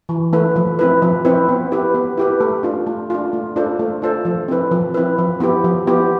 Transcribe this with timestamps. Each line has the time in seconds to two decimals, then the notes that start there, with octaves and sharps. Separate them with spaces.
0.09 E3
0.33 A3 E4 B4
0.56 F3
0.79 C4 E4 B4
1.02 F3
1.25 C4 E4 B4
1.49 B3
1.72 E4 G4 B4
1.94 B3
2.18 E4 G4 B4
2.40 A3
2.63 D4 F4
2.87 A3
3.10 D4 F4
3.33 A3
3.56 D4 F4 A4 C5
3.79 A3
4.02 D4 F4 A4 C5
4.25 F3
4.48 C4 E4 B4
4.71 F3
4.94 C4 E4 B4
5.18 F3
5.40 B3 E4 G4
5.64 F3
5.87 B3 E4 G4